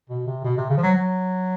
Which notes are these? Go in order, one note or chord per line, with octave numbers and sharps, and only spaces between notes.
B2
C3
B2
C3
C#3
F3
F#3
F#3